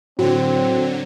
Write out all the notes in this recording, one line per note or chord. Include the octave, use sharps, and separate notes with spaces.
A2 D3 F#3 C4 F#4